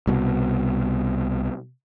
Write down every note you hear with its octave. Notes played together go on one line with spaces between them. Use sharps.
C2 B2